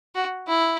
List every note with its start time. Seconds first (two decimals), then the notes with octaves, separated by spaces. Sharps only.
0.15 F#4
0.48 E4